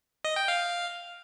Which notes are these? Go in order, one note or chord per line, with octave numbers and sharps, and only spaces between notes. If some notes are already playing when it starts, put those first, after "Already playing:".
D#5
G5
F5